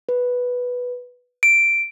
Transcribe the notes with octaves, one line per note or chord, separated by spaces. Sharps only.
B4
D7